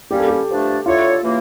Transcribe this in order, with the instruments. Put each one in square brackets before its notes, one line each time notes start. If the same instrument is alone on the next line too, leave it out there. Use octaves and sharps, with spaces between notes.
[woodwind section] G3 A#3 C#4 [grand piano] G4
[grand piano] A4
G4
[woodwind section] G2 F3 A3 D4
[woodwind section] D3 A3 E4 A4 C#5 [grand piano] F4
[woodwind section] C#3 E3 A#3